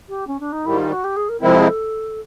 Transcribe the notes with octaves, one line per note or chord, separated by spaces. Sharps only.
G4
C#4
D4
D#4
G#2 D#3 G3 E4
F4
F#4
G4
G#4
A#4
C3 F3 G#3 C4 E4 A#4
A4
G#4
A4